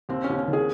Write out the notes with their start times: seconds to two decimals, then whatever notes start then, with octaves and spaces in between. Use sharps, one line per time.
0.09 D#2 C4
0.24 C#4
0.29 D#2
0.38 C#4
0.47 D#3
0.53 G#4